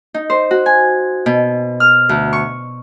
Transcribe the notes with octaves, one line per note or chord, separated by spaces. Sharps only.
D#4
C5
F#4
G#5
B2
F6
D2
C#6